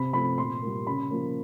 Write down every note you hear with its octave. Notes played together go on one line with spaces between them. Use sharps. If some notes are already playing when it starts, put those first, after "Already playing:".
Already playing: C3 B5
F3 A3 B5
A#2 C6
G3 A#3
C#3 B5
F3 A#3